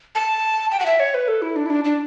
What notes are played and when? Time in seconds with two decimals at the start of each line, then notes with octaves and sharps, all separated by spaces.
0.15 A5
0.72 G5
0.80 F#5
0.86 E5
1.00 C#5
1.14 B4
1.28 A4
1.42 E4
1.56 D4
1.66 E4
1.70 D4
1.84 D4